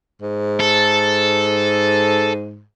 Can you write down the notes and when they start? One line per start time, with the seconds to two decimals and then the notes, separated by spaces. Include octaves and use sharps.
0.22 G#2
0.60 A4